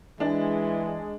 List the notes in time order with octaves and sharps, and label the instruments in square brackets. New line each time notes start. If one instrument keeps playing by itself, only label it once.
[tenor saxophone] E3 [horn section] G#3 [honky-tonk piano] D4